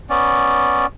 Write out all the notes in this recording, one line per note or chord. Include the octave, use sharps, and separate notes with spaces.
B3 C#4 D5